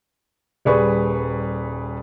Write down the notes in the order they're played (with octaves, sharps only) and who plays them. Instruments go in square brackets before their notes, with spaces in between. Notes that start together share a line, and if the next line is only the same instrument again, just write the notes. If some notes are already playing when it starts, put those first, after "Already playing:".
[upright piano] D#1 G3 G#4 B4 C#6